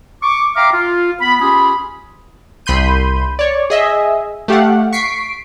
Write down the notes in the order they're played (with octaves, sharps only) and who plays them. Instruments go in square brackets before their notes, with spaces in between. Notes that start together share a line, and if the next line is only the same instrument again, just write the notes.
[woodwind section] C#6 D6
E5 F5 G5 A#5 D6 F6
F4
B3 B5
C#4 F4 G4 G#4 B5
[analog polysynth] C2 B5 C6 G6 D#7
C#5 D5
G#4 D#5 E5
A3 G4 F5 F#5
C#6 B6 C7 D7